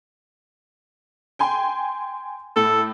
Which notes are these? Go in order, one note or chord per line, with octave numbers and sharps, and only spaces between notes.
G5 G#5 C6
A2 A4